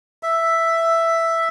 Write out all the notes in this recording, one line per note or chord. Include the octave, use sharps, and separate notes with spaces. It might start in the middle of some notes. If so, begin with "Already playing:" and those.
E5